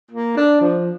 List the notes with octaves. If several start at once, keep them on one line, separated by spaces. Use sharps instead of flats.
A#3
D4
F3